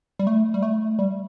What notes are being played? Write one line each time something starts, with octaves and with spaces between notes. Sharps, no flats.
G3
A3
G3
A3
G3